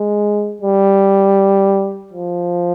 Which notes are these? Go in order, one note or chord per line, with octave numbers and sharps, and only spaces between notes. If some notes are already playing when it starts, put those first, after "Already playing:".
Already playing: G#3
G3
F3